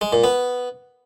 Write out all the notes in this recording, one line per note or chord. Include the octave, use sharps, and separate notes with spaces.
G#3
A#2
B3